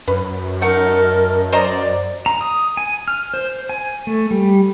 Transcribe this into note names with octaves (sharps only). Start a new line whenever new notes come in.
F#2 B4
A3 D#4 A#4 F#5
C5 D5 D#5 A#5
A#5
D#6
G#5
F6
C5
G#5
A3
G3